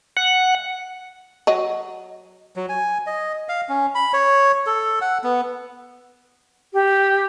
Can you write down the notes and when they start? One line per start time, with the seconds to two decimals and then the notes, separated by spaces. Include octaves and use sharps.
0.17 F#5
1.47 F#3 D#5
2.56 F#3
2.69 G#5
3.06 D#5
3.49 F5
3.69 C#4
3.95 B5
4.13 C#5
4.66 A4
5.01 F#5
5.24 B3
6.73 G4